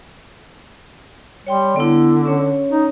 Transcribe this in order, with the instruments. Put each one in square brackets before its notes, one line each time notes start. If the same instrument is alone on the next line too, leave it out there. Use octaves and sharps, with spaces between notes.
[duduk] G3 [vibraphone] C#5 G5 C6
[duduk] D3 [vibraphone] B3 E4
[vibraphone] C#4 C#5
[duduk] D#4